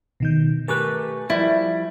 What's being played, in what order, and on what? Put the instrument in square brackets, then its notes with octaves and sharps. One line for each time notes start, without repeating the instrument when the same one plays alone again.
[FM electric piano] B2 D#3 G6
[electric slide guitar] A3 G4 B4 [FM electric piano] A#4 G#5 C#6
[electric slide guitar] F3 G3 D5 [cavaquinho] E4